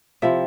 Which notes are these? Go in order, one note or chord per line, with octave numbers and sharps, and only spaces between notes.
C3 F3 C4 E4 E5